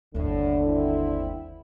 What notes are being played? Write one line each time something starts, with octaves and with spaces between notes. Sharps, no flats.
G1 D#2 A2 D3
C4 E4